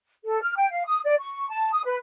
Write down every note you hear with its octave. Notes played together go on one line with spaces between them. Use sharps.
A4
F6
G5
F5
D#6
D5
C#6
A5
D#6
B4